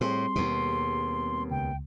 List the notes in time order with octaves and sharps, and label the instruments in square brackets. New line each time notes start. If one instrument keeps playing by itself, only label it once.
[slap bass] A2 [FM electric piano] G3 C4 G#4 [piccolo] C6
[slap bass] D#2 B2
[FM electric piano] C#2 [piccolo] G5